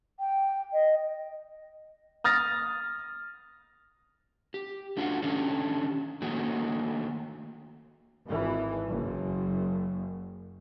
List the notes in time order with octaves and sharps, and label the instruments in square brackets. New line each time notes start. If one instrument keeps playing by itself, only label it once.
[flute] G5
D#5
[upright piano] D#6 F6 A6 A#6
[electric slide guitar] G4
A3 D4 F4 F#4 D#5 F#5
D#3 C#4 D4 G4 A4
D#3 A3 A#3 F#4 G#4
[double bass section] G#1 E3
F#1 F#2